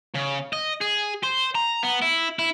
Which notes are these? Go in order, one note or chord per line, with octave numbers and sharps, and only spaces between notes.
C#3
D#5
G#4
C5
A#5
B3
E4
E4